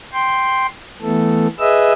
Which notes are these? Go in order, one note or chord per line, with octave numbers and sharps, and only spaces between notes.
G5 C6
E3 A3 B3 A4
G#4 B4 D#5 E5 E6